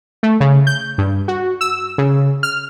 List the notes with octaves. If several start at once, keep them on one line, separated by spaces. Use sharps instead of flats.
A3
C#3
G6
G2
F#4
E6
C#3
F6